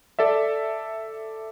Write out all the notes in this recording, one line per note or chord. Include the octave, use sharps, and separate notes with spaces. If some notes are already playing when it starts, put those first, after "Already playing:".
A4 D5 E5